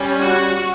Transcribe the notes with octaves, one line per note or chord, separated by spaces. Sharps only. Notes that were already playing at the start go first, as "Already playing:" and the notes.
Already playing: G3 C#4
F#4